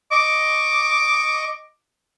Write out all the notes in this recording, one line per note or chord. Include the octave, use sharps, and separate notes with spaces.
D#5 C#6 D6